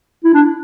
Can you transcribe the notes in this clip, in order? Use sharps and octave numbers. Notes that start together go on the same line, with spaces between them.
E4
D4